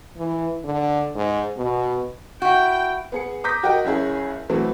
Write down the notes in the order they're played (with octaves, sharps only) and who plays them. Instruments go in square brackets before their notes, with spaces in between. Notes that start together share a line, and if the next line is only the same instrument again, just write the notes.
[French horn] E3
D3
G#2
B2
[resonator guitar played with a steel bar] E4 F#4 [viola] G5
[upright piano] B3 G#4 C#7
A#5 D6 D#6 G6 A#6 B6
F#4 G4 A#4 D#5 G5
F#1 C#4 E4 G#4
E3 F#3 A3 B3 C4